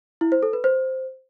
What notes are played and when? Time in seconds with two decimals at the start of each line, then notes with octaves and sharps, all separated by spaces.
0.21 E4
0.32 C5
0.43 A4
0.53 B4
0.64 C5